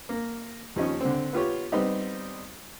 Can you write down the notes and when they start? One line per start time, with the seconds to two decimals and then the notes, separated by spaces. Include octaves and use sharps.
0.09 A#3
0.76 D#2 F3 C#4 D#4
1.01 D3 C4
1.33 B3 F4 G4 C#5
1.72 G3 B3 C4 D#4 G4